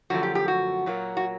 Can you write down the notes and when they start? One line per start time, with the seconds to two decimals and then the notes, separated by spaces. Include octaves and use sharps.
0.10 F#2 D3 F3 A3 F#4
0.23 G4
0.35 G4
0.48 F#4
0.86 A#2 F#3 A#3
1.17 F#4